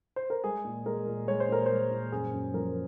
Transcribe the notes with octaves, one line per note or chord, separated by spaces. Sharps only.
C5
A#4
G#3 G#4
A#2
G#3 A#4
A#2
G#3 C#5
C5
A#2 A#4
G#3 C5
A#2
F#2 G#4
F#2
F3 A#4